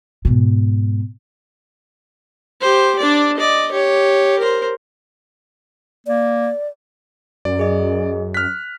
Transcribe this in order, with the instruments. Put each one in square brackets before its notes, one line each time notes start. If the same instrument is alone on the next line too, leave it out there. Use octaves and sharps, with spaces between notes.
[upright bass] G#2 B2
[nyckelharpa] G4 C5
D4 D5
D5 D#5
G4 C#5
A#4 C5
[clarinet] A#3 [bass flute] D5
[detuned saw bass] F#2 [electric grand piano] D5
[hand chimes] G#4 D#5
[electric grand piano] F6 B6 [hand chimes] F#6